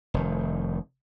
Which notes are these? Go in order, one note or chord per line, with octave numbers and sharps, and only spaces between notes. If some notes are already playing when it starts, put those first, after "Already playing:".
F1 D#3